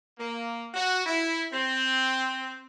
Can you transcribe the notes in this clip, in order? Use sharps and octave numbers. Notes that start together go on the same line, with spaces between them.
A#3
F#4
E4
C4